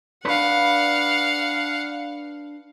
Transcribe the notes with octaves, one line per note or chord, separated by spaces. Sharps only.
D4 B4 F5 F#5